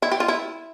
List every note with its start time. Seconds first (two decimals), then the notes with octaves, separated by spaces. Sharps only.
0.02 E4
0.12 G4
0.20 F4
0.28 E4